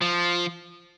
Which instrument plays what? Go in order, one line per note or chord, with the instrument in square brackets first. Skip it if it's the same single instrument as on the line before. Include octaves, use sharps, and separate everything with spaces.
[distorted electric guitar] F3